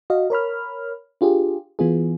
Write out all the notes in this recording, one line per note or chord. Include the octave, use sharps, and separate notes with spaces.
F#4 D#5 F5
A#4 C#5 B5 F6
D4 F4 G4 G#4
E3 B3 F4 G#4